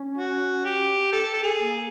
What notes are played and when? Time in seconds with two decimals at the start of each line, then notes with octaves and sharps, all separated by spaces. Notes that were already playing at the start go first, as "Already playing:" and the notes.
Already playing: C#4
0.18 F#4
0.65 G4
1.12 A4
1.33 A4
1.43 G#4
1.60 A#3